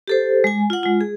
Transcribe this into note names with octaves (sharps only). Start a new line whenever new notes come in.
G4 A4 C5
G#3 G#5
F4 F#5
G#3 F4
G#4